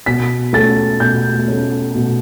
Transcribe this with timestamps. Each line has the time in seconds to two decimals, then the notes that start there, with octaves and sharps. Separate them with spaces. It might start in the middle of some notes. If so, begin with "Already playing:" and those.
0.06 B2 B6
0.53 A3 C#4 A6
1.00 B2 G6
1.48 A3 C#4
1.95 B2